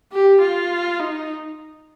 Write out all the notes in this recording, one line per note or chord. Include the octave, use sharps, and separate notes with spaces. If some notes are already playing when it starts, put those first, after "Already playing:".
G4
F4
D#4